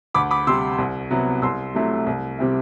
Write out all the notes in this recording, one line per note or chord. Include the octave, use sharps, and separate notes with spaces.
D2 B5 D6
B5 D6
C3 G3 C6 E6
C2
C3 F#3 B3 E4
C2 C6 E6
C3 F#3 A3 E4
C2
C3 G3 C4 E4